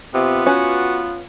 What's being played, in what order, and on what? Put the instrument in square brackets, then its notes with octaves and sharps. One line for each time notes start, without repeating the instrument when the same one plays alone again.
[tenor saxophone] C3 [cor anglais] B3 [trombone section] F4
[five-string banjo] C#4 B4 G#5 [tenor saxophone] F#4